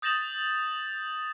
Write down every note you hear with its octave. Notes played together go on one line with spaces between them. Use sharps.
D#6 G6 A6 A#6 E7 F#7